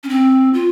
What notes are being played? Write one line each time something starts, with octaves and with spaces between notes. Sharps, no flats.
C#4
C4
F4